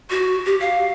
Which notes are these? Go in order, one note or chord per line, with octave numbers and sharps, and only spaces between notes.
F#4
G4
F5